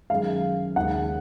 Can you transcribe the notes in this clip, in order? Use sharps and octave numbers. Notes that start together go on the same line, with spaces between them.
F#2 D#3 G#3 F5
D#2 C#3 G#3 F#5